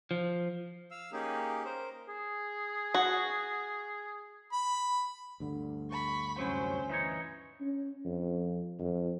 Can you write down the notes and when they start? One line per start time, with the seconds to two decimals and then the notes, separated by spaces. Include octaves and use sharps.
0.11 F3
0.91 F5 E6
1.13 A#3 C#4 D#4 G4 G#4
1.65 A#4 C5
2.09 G#4
2.95 F#4
4.53 B5
5.40 D2 G2 D3
5.90 B5 C#6
6.39 C2 F#2 F#3 C#4 C5
6.90 E3 D#4 C#5
7.61 C#4
8.05 F2
8.79 F2